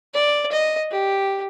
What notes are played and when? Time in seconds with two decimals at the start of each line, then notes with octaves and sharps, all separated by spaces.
0.14 D5
0.52 D#5
0.91 G4